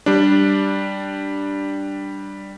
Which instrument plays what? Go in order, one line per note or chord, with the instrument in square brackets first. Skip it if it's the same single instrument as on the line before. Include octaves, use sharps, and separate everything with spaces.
[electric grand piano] G3 D4